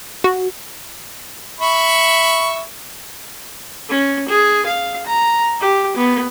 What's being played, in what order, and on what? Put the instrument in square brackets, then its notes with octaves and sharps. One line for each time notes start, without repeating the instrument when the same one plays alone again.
[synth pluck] F#4
[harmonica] E5 B5 C#6
[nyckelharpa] C#4
G#4
F5
A#5
G4
B3